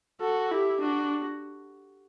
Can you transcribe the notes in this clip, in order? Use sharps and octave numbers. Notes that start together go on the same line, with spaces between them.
F#4 A4
E4 G4
D4 F#4